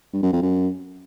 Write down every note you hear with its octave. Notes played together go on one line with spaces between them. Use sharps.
G2
F#2
F2
F#2